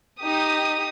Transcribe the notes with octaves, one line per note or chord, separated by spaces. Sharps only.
D#4 G4 D#6